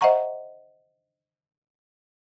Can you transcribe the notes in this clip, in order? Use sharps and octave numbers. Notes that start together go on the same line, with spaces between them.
C5 D#5 E5 F#5 A#5 C#6